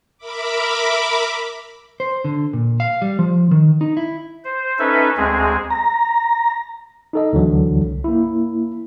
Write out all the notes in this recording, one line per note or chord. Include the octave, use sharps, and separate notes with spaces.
A#4 E5 B5 D6
C5
D3
A#2
F5
G3
F3
D#3
D#4
E4
C5
C#4 D#4 A4 B4 E5
D2 G#3 C4 G#4
A#5
D#4 A4 D#5
D2 D3 E3 F#3
C2
A#3 E4